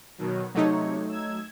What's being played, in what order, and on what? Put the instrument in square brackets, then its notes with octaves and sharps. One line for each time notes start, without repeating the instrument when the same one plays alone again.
[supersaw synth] B2 D#3 F#3
[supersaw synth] C3 C#5 [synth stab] F#3 A3 D#4
[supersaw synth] E6 G#6